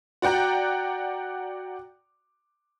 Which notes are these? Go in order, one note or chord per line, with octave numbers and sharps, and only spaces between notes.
F#4 D5 F#5 G5 A#5